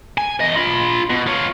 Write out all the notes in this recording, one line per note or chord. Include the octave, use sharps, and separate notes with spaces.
G#5
E2 D#5
F4 B5
B2
F4 C#5